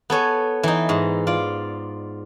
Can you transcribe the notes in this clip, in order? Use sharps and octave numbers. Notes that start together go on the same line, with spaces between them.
B3 A4 C#5 G#5
E3 D#4
G#2
F4 D5